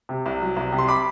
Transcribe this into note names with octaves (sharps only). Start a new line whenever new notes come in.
C3
C2
F#3
C2
C3
C6
B5 D6